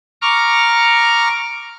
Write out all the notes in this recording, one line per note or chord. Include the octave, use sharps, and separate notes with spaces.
A#5 C#6 D6 F6